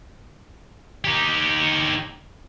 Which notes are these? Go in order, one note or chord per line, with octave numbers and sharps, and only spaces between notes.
D#4 G4